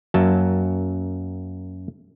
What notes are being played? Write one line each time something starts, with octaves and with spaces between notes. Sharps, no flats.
F#2 F#3 A#3 A5